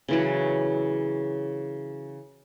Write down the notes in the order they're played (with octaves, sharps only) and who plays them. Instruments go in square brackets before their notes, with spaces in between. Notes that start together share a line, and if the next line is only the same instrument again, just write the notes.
[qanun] C#3 E3 F#3